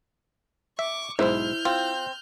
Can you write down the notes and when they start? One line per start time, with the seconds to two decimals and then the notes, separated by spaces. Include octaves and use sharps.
0.79 E5 C#6 D6
1.19 B1 G#2 E4 C5 F6 G6
1.65 C4 F4